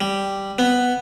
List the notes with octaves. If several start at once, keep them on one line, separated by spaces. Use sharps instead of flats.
G3
B3